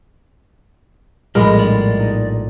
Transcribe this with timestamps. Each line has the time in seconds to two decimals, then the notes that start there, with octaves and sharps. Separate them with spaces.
1.35 A#1 A2 G3 G#3 A#4 D#5 B5
1.58 D5
2.00 D#4